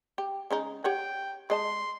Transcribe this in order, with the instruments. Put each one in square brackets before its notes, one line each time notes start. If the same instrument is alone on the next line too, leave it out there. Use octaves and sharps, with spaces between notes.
[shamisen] G4
C#3 G#3 D#4
[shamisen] G4 C#5 F#5 [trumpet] G5
[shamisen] G#3 D#5 A5 [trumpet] C6